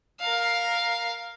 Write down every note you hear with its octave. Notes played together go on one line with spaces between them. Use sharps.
A#4 F5